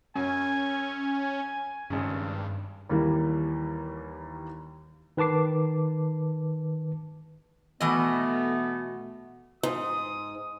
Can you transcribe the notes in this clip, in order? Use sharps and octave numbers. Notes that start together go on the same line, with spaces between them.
F#2 C#4 G#5
G#1 G2 C#3
D#2 E3 G3 A#3
D#3 B4 A5 D6 C7
B2 E3 A3 B3 D#5
G#2 D#6